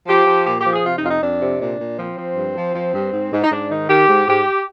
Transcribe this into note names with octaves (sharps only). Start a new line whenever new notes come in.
F3 G4
F3
A#2 G4
G4
F3
G#4
C3 F4
D#4
F2 F4
D#4
F2 D4
C3
A#2 D4
A#2
F3 C4
F3
G2
F3
F3
G2
G#2
G#2
D#4
G#2 D4
D#3 D#4
D#3 G4
G#2
G#2 G4